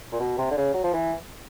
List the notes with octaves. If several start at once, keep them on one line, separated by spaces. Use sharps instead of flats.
A#2
B2
C3
D3
C#3
F#3
F3
E3